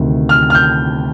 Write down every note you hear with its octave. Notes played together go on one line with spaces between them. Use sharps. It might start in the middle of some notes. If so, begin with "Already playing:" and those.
Already playing: D2 C3 D#3
F6
F6
G6